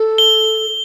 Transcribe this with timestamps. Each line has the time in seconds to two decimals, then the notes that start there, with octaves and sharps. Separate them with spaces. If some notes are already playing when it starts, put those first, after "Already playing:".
Already playing: A4
0.18 G7